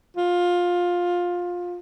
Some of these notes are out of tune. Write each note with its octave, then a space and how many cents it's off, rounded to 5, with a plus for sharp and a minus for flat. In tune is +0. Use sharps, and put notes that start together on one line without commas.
F4 +15